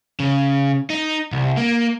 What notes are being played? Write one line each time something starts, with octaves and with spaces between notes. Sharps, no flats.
C#3
D#4
C2
A#3